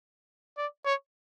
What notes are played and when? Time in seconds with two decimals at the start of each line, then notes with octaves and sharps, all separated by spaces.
0.58 D5
0.86 C#5